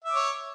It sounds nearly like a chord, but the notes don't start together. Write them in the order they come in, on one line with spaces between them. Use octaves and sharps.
E5 D6 C#5